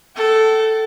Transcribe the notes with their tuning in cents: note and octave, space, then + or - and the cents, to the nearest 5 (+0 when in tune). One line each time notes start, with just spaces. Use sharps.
A4 +0 G5 -45